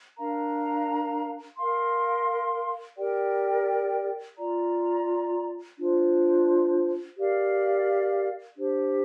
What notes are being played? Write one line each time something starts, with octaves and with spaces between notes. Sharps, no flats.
D4 A#4 F5 A#5
A#4 F5 C6
G4 A#4 D5 G5
F4 D5 A#5
D4 F4 C5
G4 A#4 D5 F5
D4 G4 C5